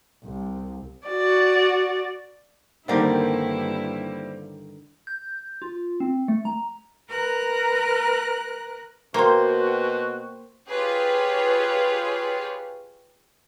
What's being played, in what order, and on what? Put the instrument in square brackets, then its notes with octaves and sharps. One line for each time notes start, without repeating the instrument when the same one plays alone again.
[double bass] C2
[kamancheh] F#4 D5
[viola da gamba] G2 E4 [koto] D3 D#3 G4 [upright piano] G3 A#3 C4
[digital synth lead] G6
F4
C4
A3
A#5
[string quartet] A#4 B4 A#5 F#6
[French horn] B2 [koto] A#3 [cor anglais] F#4 [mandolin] C5 G5 C6
[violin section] F4 G4 G#4 B4 C#5